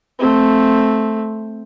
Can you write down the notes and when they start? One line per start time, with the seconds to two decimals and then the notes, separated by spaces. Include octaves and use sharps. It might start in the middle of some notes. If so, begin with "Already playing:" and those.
0.19 A3 C4